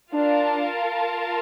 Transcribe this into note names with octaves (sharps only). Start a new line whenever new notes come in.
D4 F4 A#4 F5 A5